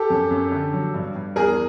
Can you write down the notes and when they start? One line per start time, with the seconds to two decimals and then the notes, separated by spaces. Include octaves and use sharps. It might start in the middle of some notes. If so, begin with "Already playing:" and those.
Already playing: G4 A4
0.10 F#2
0.31 F#2
0.52 D3
0.73 F#3
0.94 G2
1.16 G2
1.36 E2 G#4 A#4